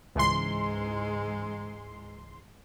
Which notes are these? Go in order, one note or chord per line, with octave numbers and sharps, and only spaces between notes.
C#2 G#2 E3 G#3 C6